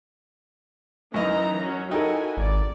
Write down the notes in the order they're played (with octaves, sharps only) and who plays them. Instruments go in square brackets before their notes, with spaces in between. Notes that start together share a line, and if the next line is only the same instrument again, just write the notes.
[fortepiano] F#2 D#5 [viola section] E3 D#4 A#5
[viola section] F#3 C#4
[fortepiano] D#4 [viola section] E4 F#4 G#5 [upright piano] A4 A#4 G5
[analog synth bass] G#1 [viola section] D5